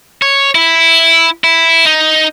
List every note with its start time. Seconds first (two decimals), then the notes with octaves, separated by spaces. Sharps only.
0.22 C#5
0.55 E4
1.44 E4
1.85 D#4